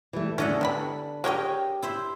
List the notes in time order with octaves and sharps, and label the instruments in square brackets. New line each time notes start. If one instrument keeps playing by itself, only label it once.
[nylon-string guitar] E3 G3 A3
[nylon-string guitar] E2 A3 [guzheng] D3 D#5 F#5 [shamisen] C#4
[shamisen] E3 G3 B5 [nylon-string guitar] D4
[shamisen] G#3 C#5 G5 [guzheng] G4 A#4 D#5
[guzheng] E4 C5 E5